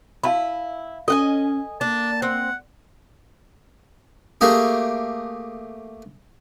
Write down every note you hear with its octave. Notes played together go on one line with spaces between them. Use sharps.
E4 F5 A5 B5
C#4 A4 D#5 F#5 G#5
A#3 D4 A5
C4 F#5
A3 A#3 G4 G#4